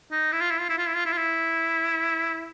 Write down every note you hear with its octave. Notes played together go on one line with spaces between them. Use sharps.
D#4
E4
F4
E4
F4
E4
F4
E4
F4
E4
F4
E4